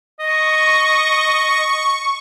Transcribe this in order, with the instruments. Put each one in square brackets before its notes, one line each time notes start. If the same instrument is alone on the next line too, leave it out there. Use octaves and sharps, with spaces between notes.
[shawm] D#5 [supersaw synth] C#6